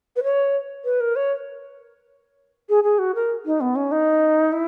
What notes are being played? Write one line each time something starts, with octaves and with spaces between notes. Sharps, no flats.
B4
C#5
B4
A#4
C#5
G#4
G#4
F#4
A#4
D#4
B3
C#4
D#4
E4